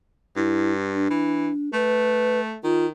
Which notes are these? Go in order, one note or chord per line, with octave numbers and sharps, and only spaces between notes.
G2 E4
D4
E3
A3 B4
D#3 F4